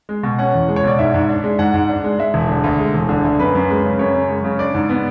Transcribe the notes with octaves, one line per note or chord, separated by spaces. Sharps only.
G#3
B2
C#4 F#5
E2
G#3
C#5
B2 D5
G#2 E5
G#2
D4
G#3
G#2 F#5
G#2
D4
G#3
G#3 E5
E1
D3
D2
G#3
E1
D3
D2
F#2 B4
F#2
G#3
C#3
F#2 C#5
F#2
G#3
C#3
D4 D5
G#2
B3